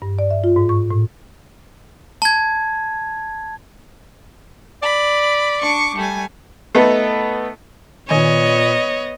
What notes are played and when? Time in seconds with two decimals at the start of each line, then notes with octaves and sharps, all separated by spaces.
0.02 G2
0.19 D5
0.31 E5
0.44 F4
0.56 G#2
0.69 C#6
0.91 A2
2.22 A5 G#6
4.82 D5 B5
5.60 D4 C#6 D6
5.96 G3 A3 G#5
6.75 A3 B3 D#4 A4
8.09 A#2 D#3 B3 C#5 D#5 G#5